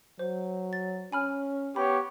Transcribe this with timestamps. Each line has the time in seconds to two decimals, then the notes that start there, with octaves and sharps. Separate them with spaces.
0.19 F#3 C5
0.73 A6
1.12 C#4 G#5 B5 F6
1.76 B3 G4 C#5 B5